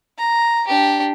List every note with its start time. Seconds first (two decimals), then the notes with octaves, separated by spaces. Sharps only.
0.18 A#5
0.67 D4 G4